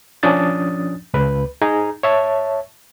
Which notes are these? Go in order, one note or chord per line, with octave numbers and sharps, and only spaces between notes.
F3 C#4 D4 D#6 A6
C#2 B4
D#4 G#4 A#5
C#5 E5 A5